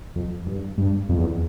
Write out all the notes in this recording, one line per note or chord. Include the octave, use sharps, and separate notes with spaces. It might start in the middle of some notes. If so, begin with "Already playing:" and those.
F2
G2
G2
F2
E2